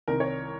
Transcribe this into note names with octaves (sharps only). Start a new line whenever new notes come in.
C2 C3 D#3 A#4
C#5